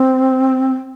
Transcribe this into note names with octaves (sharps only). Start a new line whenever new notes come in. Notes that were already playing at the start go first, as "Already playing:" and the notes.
Already playing: C4